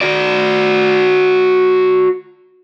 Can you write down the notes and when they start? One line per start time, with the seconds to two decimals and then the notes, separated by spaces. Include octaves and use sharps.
0.01 F#4 D5